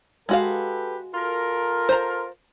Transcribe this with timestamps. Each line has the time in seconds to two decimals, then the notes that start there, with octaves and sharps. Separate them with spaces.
0.29 G#3 F#4 G4 A4 B4 F5
1.14 F4 A4 A#4
1.89 C5 A#5